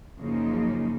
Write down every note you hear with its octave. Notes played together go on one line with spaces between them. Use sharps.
F#2 C#3 F3 A#3 D#4